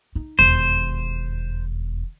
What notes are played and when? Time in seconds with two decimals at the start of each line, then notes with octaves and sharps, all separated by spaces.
0.15 D#4
0.39 E1 D#2 C5